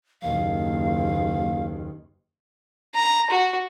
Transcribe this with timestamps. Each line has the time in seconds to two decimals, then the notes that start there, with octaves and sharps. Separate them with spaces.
0.22 F#1 D#2 F5
2.95 A#5
3.30 F#4